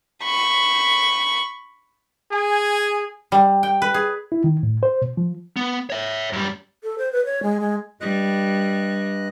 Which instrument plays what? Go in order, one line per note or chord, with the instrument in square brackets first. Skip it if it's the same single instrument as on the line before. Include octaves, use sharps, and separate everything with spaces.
[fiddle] B5 C#6
[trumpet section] G#4 G#5
[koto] G3
G5
B4
G#4
[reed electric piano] E4
D#3
A2
C5
B2
F3
[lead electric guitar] B3
C#5 E5
F#2 G3
[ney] A4
C5
B4
C#5
G#3
G#3
[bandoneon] G2 D#5 F#6 [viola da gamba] G3